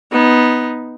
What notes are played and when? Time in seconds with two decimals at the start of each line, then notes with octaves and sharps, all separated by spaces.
0.12 B3 D#4